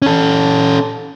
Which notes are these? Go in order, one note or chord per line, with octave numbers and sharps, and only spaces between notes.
C#4 A4